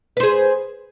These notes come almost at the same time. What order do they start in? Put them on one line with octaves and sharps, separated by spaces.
B4 C5 G#4